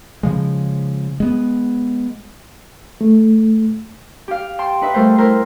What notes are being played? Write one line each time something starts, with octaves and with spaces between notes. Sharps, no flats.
C#3 F3 G#3
G#3 B3
A3
G4 F5
G5 A5 C6
D#4 B4 E5
G3 A3 A#4 C5
E4 A#4 C5